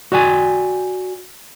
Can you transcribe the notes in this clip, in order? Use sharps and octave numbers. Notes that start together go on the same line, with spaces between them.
F#4 D5 G5 G#5